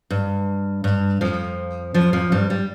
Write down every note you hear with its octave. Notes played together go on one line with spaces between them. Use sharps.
G2
G2
F2 F3
F2 F3
F2 F3
G2 G3
G3